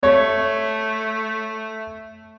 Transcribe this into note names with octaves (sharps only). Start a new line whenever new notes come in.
A3 C#5